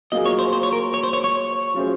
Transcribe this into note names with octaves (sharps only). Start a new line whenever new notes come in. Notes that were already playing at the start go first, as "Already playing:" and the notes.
F#3 A#3 F4 G#4 D#5
C#5
C5
C5
C#5
A#4
C#5
C5
C#5
C#5
F#3 C#4 F4 G#4 C5